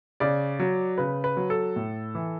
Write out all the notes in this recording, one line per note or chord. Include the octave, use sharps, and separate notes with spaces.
C#3 D5
F#3
C#3 B4
B4
F#3
A4
A2
E3